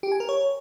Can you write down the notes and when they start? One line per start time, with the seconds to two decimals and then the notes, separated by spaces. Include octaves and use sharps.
0.03 G4
0.12 G#5
0.20 A#4
0.29 C#5